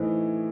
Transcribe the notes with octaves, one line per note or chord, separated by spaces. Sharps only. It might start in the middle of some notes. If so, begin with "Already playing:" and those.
Already playing: A2 E3 A3 D#4 C5